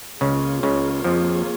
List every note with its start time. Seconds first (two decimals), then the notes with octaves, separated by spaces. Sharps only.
0.21 C#2 C#3 A#3 F4 G#4 C#5
0.63 C#2 C#3
1.04 F2 F3